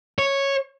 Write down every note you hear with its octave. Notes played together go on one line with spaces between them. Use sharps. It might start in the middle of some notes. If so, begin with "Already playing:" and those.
C#5